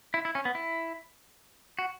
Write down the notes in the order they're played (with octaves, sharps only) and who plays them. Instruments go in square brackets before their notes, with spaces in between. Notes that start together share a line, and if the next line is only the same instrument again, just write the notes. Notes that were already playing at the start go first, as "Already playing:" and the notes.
[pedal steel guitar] E4
E4
C#4
B3
E4
F#4